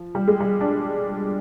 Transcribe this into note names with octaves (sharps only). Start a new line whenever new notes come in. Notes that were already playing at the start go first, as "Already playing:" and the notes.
Already playing: F3
G3
G#3
G3
D4